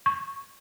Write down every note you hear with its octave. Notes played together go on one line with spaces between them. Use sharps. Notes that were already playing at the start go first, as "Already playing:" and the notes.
C#6